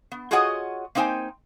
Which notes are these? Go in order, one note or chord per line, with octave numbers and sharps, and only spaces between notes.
B3
F4 F#4 G#4 C#5 D#5 F#5
A#3 C4 D#4 C5 G5 G#5